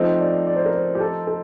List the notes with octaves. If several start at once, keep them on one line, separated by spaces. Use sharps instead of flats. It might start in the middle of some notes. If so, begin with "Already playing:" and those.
Already playing: F3 A3 C4 D#4
D5
D5
C5
A#4
C5
G4
A4
A4